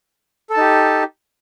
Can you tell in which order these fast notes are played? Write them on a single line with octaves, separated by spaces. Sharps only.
A4 A5 D#4 G4